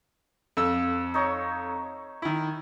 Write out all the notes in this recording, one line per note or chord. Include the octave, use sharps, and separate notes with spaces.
F2 A4 E6
D#4 C#5
D#3 E4